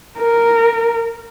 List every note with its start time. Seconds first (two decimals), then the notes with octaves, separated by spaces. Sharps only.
0.18 A#4